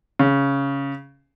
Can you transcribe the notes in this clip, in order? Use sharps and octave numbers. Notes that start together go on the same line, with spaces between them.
C#3